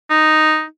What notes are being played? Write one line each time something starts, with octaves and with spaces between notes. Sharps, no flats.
D#4